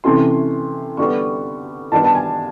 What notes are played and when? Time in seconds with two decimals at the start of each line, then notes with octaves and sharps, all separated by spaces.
0.04 C3 E3 A3 C#4 C6
0.97 D3 G3 B3 C#6
1.92 D#3 G3 B3 D4 A5
2.04 A5
2.15 G#5